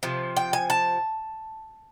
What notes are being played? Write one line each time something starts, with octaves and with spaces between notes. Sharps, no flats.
C3 F3
G5
G#5
A5